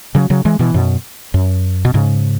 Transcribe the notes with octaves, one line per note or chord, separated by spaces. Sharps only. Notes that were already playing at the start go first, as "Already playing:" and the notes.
C#3 F#3
C#3 F#3
E3 G#3
B2 E3
F#2 B2
F#2
B2
G#2 C#3